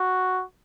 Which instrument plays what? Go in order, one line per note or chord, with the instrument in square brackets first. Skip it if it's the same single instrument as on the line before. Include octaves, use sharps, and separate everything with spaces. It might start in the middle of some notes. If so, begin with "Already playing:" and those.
Already playing: [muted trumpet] F#4